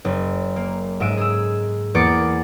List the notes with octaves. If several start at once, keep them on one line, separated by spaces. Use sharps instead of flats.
F#1
A#3
G#2 G#3 E5 D7 D#7
G#4 E6
E2 A#3 D6 A6 C#7